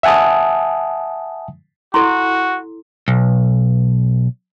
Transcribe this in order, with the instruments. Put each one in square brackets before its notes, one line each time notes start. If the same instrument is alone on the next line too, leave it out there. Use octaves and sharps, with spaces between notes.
[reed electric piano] E5 F#5 G#5 A5 D#6
[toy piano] E4 A4 [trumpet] F#4 [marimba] C6
[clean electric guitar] B1